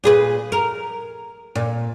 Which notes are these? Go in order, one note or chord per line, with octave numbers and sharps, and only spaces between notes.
A#2 G#4 B4
A#4
A#2